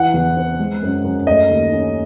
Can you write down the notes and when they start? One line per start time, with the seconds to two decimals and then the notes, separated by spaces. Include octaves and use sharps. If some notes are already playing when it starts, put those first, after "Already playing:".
Already playing: E3 F#5
0.14 E2
0.37 C4
0.59 G#3
0.82 F#2
1.04 F#2
1.27 A3 D#5
1.50 D#2
1.73 C#4